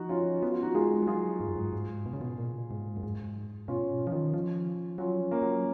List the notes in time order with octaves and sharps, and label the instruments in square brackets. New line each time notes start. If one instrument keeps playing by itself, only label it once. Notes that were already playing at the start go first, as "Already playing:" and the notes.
Already playing: [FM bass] F3 [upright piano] D#4 F#4
[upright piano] C#4 F4
[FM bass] B3 [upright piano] F#4
[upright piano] F4
D#4 F#4
[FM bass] G#3 [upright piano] F4 G#4
[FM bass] G#3
[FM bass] F#3 [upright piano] F4 G#4
[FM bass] G#2
F#2
G#2
G#2
B2
C#3
B2
A#2
G#2
F#2
G#2
[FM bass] B2 [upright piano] C#4 F4
[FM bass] F3
D#3
F3
[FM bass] F#3 [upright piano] C#4 F4
[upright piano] A#3 C#4
[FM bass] F#3